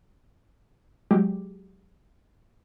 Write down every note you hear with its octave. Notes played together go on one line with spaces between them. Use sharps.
F#3 G#3 G4